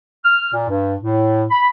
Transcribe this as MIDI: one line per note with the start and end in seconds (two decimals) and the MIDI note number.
0.25 0.52 89
0.53 0.65 46
0.69 0.95 43
1.01 1.44 45
1.50 1.69 83